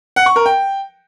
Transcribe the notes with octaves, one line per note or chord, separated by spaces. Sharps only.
F#5
C#6
A#4
G5